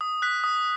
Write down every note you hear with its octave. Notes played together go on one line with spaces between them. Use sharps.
D#6
F#6 B6
D#6